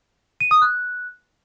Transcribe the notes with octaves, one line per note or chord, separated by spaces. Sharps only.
D#7
D#6
F#6